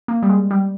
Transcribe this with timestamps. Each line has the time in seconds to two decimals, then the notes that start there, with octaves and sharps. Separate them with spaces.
0.08 A#3
0.23 G3
0.29 G#3
0.51 G3